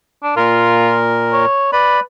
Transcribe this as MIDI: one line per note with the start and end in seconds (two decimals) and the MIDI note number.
0.24 0.32 62
0.37 1.45 46
0.37 0.99 65
0.37 1.45 70
1.33 1.72 73
1.73 2.00 71
1.73 2.00 74
1.73 2.00 83